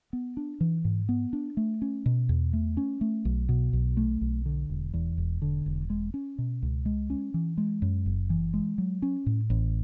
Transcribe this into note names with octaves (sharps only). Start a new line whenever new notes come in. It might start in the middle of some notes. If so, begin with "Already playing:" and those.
B3
D4
E3
G#2
B3
D4
A3
C#4
B2
E2
A3
C#4
A3
B1
B2
B1
A3
B1
D3
E1
E2
E1
D3
E1
G#3
C#4
B2
C#2
G#3
C#4
E3
G#3
F#2
F#1
E3
G#3
F#3
C#4
A2
A1